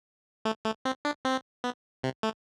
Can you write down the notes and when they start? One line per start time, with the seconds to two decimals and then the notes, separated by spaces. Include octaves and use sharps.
0.45 A3
0.65 A3
0.85 C4
1.05 D4
1.25 C4
1.64 B3
2.03 C3
2.23 A3